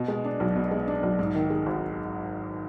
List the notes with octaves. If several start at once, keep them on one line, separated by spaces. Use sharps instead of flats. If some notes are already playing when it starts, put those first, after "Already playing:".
Already playing: B2
G#3
D4
B1
B2
G#3
D4
B1
G#2
D#3
G#3
G#1